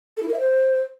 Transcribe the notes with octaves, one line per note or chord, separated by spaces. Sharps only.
A4
E4
A#4
E5
C5